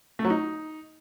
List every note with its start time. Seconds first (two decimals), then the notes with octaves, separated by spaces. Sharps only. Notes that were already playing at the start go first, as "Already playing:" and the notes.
0.19 A3
0.25 F#3
0.30 D#4